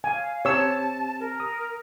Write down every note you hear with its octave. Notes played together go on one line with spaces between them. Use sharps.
F5 G#5
C4 G4 C#5 A5 E6
A#4
D#6